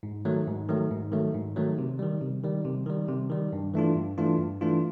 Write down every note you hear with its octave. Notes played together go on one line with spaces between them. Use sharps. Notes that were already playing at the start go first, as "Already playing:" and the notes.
G#2
D#3 F#3 A3
G#2
D#3 F#3 A3
G#2
D#3 F#3 A3
G#2
D#3 F#3 A3
C3
D#3 G3
C3
D#3 G3
C3
D#3 G3
C3
D#3 G3
G2
E3 A3 D4 F4
G2
E3 A3 D4 F4
G2
E3 A3 D4 F4